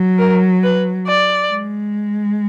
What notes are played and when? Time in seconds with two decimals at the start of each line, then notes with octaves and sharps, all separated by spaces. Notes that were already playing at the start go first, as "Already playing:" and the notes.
Already playing: F#3
0.18 A#4
0.63 B4
1.07 D5
1.51 G#3